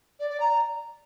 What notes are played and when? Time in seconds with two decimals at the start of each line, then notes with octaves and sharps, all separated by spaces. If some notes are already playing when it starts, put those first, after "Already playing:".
0.19 D5
0.29 D5
0.40 A#5